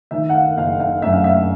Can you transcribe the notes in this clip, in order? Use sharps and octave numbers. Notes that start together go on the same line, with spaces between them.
D#3 E5
F#5
F5
F#1 F5
F5
F#2 E5
F5
E5